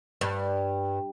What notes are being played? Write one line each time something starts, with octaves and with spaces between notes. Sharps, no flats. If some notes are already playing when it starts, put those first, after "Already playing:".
G2